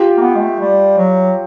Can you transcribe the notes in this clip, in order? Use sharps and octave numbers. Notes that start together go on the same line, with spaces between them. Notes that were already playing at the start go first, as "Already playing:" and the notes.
Already playing: F4 G4
A#3
B3
G#3
A3
G3
F#3